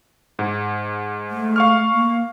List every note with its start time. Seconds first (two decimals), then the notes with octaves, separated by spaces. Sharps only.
0.39 G#2
1.30 A3
1.56 F5 C#6 F6
1.92 A#3